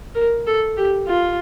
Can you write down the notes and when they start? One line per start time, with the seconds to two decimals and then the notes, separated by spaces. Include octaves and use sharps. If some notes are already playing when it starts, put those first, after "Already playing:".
0.15 A#4
0.46 A4
0.77 G4
1.07 F4